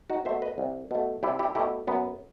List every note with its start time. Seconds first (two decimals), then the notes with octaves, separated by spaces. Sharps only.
0.10 D#4 F#4
0.25 B2 C5 E5
0.29 A3
0.42 B4 D#5
0.58 C2
0.91 B2 A3
1.23 C2 E4 G4
1.39 E4 G4
1.55 B2 A3 E4 G4
1.87 F#2 B3